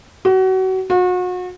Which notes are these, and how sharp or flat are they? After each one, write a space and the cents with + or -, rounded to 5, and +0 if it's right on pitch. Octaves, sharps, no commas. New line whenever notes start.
F#4 +30
F#4 -35